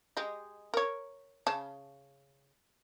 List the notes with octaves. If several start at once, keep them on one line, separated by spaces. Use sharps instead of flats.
G#3 G4 D#5
A#4 C#5
C#3 A5